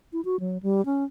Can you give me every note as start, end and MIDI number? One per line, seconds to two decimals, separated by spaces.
0.13 0.21 64
0.25 0.39 66
0.40 0.58 54
0.63 0.84 55
0.85 1.04 61